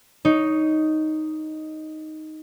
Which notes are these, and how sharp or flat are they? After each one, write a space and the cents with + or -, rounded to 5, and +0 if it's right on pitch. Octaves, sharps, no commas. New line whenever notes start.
D#4 +0 C#5 +15